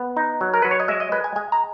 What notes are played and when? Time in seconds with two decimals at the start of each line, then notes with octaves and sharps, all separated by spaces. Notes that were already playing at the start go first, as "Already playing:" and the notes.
Already playing: B3
0.17 D#4
0.41 F#3
0.54 A#4
0.62 F#3 B4
0.71 C#5
0.80 D#5
0.88 G#3 E5
1.00 D#5
1.12 G#3 B4
1.24 G#5
1.36 G#3 G#5
1.52 A#5